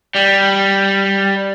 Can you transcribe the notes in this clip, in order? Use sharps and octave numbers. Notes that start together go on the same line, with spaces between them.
G3